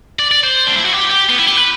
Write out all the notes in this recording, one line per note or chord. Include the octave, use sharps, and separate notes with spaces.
D5
D5
C5
D4
E4
F#4
G4
G4
B3
E4
G4
B4